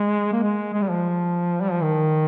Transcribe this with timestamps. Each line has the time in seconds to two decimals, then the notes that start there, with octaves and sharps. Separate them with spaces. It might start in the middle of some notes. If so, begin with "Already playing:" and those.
Already playing: G#3
0.33 A#3
0.43 G#3
0.73 G#3
0.82 G3
0.90 F3
1.61 G3
1.72 F3
1.83 D#3